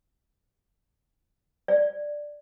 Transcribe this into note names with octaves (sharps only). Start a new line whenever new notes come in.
D5